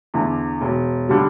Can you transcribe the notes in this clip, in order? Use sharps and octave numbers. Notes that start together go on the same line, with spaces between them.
E2 D3
E1
D3 G3